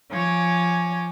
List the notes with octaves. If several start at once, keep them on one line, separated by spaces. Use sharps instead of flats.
F3 C#5 G#5 D6